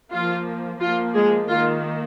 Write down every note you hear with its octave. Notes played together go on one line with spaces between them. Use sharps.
F3 A#3 F4
F3 A#3 F4
G#3 G#4
D#3 A#3 F4